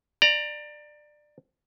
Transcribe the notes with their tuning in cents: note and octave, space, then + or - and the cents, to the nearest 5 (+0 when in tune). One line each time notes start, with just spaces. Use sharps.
D5 +20 A#5 +0